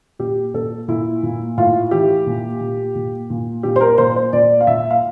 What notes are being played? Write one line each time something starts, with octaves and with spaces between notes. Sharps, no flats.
A#2 G4
A#2 A4
A#2 E4
A#2
A2 F4
E3 G4
A#2
A#2
A#2
A#2
A#2 G4
C5
A#4
A#2 C5
C5
A#2 D5
F5
A#2 E5
F5